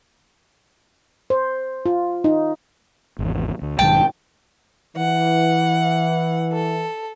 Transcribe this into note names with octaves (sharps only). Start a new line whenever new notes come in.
C5
F4
D#4
G#1 E2
D2
B1 G#2 D#3 G5 A5
E3 F#5
A4